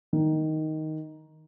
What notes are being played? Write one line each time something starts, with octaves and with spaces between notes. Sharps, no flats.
D#3